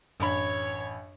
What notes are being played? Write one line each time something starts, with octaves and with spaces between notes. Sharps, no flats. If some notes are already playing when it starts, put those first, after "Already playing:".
A1 F#2 D4 C#5 B5